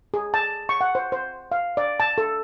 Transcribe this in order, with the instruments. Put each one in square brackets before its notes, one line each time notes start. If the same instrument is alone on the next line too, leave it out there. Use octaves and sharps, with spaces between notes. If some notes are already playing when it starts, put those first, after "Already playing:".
[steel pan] G#4
A5
C#6
F#5
C5
C5
F5
D5
A5
A4